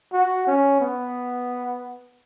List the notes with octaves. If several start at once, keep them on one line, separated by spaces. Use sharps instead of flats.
F#4
C#4
B3